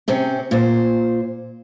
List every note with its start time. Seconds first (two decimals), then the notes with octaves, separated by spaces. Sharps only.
0.08 C3 C4 C#4
0.51 A#2 C5